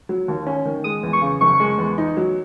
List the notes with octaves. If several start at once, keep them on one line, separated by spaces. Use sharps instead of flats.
F#3
D#2
C#4
D#3
G#3 D#6
E2
C#6
C#3
F#1 C#6
G#3
E2
D#4
F#3